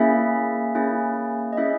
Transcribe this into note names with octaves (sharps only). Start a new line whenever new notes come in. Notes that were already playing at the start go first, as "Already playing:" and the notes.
Already playing: A#3 C#4 E4 G#4 E5
A#3 C#4 E4 G#4
D#5
C#4 E4 G#4 E5